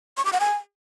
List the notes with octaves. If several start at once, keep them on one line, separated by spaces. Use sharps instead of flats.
C#6
D6
F#5
G#5